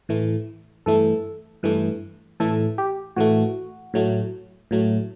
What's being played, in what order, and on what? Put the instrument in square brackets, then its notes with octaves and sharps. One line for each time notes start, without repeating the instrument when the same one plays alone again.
[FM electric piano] A2 E3 A3
G2 E3 A3 A4
G2 E3 A3
A2 E3 A3 A4
G4
A2 E3 A3 F#4
A2 F#3 A3
A2 F#3 A3